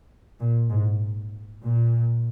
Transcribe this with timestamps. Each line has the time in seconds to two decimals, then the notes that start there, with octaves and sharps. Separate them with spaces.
0.40 A#2
0.70 G#2
1.63 A#2